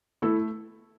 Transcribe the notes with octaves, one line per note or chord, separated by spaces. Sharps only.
A3 E4 A4